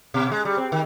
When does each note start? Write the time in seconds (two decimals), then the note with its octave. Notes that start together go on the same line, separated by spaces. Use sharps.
0.14 B2
0.32 G#3
0.45 G3
0.57 C4
0.72 D#3